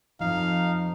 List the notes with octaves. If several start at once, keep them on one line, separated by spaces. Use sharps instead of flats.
F2 F3 D#4 F5